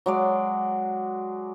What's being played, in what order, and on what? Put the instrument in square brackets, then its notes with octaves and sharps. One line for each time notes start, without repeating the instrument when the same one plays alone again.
[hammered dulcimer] F#3 G#3 D5